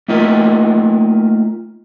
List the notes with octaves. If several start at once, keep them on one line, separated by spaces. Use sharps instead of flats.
A3 A#3 D#4 F4 D#5